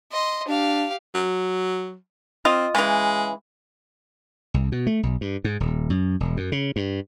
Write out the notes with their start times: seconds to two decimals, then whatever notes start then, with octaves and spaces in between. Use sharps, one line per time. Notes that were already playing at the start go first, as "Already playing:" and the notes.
0.12 D#5 C6
0.48 D4 G4 F5
1.14 F#3
2.45 C4 F4 D#5
2.75 C#3 E3 G#3
4.54 C2
4.72 B2
4.87 A3
5.03 B1
5.21 G2
5.44 G#2
5.60 D#1
5.90 F#2
6.20 E1
6.37 F#2
6.52 C#3
6.76 G2